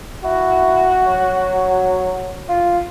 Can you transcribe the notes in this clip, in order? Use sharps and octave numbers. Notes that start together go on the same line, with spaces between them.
E4 F#4
F#3
F4